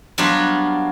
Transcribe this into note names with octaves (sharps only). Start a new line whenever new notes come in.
F#3 G3 B3 D4 F4